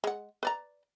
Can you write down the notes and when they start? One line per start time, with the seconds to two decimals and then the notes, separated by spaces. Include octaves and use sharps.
0.04 G#3 F#5
0.43 B4 D5 A#5